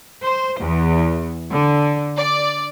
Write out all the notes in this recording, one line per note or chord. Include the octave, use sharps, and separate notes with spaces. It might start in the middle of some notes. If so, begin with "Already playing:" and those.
C5
E2
D3
D5